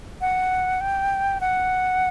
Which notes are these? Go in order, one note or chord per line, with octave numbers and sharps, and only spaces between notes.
F#5
G5
F#5